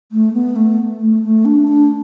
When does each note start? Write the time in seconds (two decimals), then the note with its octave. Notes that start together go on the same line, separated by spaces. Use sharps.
0.12 A3
0.34 B3
0.56 A3
1.01 A3
1.23 A3
1.45 D4
1.68 D4